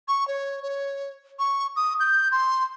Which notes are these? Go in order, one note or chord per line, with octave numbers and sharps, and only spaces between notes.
C#6
C#5
C#5
C#6
D#6
G6
C6